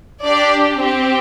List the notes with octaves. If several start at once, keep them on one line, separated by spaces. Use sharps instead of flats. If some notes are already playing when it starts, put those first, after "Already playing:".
D4 G4 D5
C4 G4